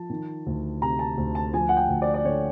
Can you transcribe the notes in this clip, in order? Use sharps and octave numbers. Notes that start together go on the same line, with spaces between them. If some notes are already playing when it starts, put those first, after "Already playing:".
Already playing: F3 A5
D#3
D2
C3 A#5
A5
D2
A5
F3 G#5
F#5
G5
D2
D5
D5
D3 C#5